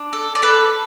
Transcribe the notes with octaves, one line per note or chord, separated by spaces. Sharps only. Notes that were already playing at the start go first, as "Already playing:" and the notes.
Already playing: D4
A4
D5
A4 B4